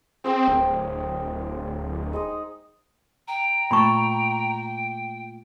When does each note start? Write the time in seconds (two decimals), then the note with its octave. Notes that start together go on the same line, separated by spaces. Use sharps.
0.24 C4 G#4 C5 G5
0.48 D1 A#4
2.13 G#3 D#4 D#6
3.28 G5 A#5
3.71 A#2 A3 A5 B5 C#6